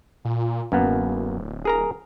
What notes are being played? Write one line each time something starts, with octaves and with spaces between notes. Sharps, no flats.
A#2
D1 F#2 A#3 B3
G#4 A#4 A#5